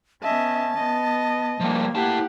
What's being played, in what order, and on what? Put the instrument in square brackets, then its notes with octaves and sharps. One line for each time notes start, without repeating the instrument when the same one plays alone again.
[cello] B3 C#4 [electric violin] D#5 E5 [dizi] A5
[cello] B3 [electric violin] D#5
[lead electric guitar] F3 G3 [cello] A#3
[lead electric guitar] E4 A5 [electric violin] G4 F#5